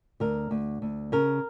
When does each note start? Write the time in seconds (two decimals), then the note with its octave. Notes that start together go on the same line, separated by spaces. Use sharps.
0.20 D2 A#4
0.51 D2
0.82 D2
1.12 C#3 A#4